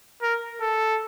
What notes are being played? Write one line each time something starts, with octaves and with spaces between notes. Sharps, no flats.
A#4
A4